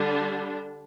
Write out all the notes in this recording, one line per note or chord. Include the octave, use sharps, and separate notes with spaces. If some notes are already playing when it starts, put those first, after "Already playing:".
Already playing: D3 G3 D4